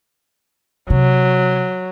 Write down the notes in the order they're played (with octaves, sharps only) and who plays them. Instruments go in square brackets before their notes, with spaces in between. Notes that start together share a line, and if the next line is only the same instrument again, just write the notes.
[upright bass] C3 [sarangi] F#3